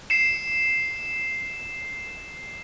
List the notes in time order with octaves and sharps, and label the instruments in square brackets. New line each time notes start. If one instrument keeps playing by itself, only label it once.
[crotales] C7 C#7 E7